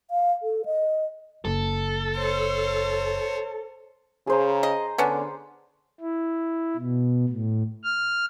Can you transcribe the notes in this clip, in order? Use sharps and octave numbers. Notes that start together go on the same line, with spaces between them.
F5
A4
D#5
F#1 A4
C5 C#5
C#3 G#4 C5 A#5
D#5
D3 B3 C#4 D4
E4
B2
A2
F6